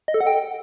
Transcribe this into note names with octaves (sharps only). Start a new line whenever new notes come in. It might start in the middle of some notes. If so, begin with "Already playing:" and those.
D#5
A4
F#5
G5